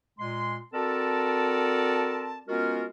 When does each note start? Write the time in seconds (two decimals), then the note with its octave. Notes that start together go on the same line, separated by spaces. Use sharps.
0.19 A#2 G#3 C6
0.73 C4 F#4 A4 A#4 D5 A5
2.48 G#3 B3 C#4 F4 F#4 A#4